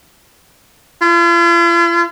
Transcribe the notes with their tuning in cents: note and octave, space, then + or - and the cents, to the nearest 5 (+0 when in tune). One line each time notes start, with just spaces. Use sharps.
F4 -45